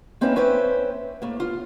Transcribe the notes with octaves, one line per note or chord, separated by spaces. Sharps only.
A#3 C4 C#4 D#4 B4 E5
C#4 B4 C5 E5 G5
A2 A#3
F4